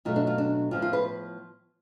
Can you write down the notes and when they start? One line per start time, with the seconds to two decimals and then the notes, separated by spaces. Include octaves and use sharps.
0.05 B2 F#3 A3 F4
0.16 D4
0.27 F4
0.38 D4
0.71 A2 F3 B3 F4
0.82 F4
0.93 B4